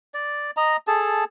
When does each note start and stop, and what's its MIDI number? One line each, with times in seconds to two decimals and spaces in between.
0.14 0.51 74
0.57 0.77 75
0.57 0.77 82
0.87 1.24 68
0.87 1.24 69
0.87 1.24 81